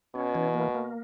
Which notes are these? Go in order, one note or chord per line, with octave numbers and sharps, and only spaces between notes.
B2 C#4
E3
A#3
A#3